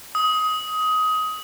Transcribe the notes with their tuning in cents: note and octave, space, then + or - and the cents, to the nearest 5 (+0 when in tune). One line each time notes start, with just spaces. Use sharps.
D#6 +20